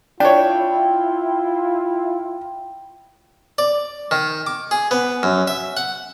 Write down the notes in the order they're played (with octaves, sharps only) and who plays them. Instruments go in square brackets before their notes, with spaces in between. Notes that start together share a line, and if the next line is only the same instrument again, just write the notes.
[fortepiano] D4 C#5 [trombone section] E4 F4 [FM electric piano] G5
[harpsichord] D5
D#3
D6
G#4
B3
F#2
E5
F#5